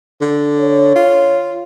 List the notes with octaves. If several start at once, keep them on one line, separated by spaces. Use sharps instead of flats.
D3
C#5
F4